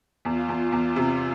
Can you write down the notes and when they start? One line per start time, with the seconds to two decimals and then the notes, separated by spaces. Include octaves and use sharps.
0.25 E2 F4
0.49 E2
0.72 E2
0.89 F4
0.96 C3